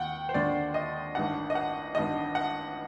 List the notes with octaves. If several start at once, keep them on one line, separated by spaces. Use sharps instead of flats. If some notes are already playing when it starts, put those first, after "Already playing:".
Already playing: D#2 F#5 G5
C5
D#2 D3 D5
D#5
A1 G2 D#3 F#5
D#5
F#5
A1 G2 D#3 D#5
F#5